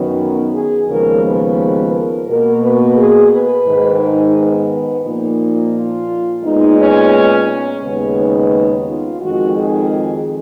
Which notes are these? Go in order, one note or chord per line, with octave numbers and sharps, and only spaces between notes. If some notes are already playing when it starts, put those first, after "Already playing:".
Already playing: F#2 D#3 F#3 B3
G#4
D#2 C#3 F3 G#3 B3 A#4
B4
A#4
B2 A#3 A#4
B4
G#4
B4
G#2 D#3 G#3
D#4
B3
A#2 F3 A#3 D#4
F4
A#2 G#3 B3 D#4
C#4
C#4
D#2 C#3 G#3 B3
D#4
F4
F2 D#3 G#3 F#4
G#4